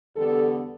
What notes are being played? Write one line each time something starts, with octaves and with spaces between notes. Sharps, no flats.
E2 D3 G3 B3 A4